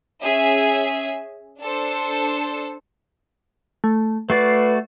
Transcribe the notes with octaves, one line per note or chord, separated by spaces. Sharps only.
C#4 G#4 E5 G#5
D4 A4 C5
A3
A3 F#4 B4 D5 C7